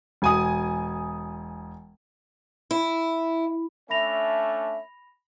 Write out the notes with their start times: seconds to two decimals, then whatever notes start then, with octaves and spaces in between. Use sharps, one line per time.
0.22 E1 G#5 D#6
2.71 E4
3.90 A3 C#4 D4 E5 B5 A#6 F7